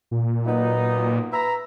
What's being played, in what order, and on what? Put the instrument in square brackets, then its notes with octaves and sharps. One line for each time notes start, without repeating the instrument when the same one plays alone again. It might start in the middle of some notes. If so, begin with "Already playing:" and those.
[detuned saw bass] A#2
[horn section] F#3 B3 D#4
B4 E5 A#5